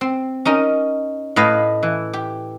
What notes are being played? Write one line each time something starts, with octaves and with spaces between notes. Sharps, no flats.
C4
C#4 D#4 A#4
A2 B4 D#5 F5
E3
G4